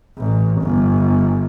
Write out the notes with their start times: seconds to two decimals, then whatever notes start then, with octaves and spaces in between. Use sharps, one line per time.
0.18 A1
0.62 G1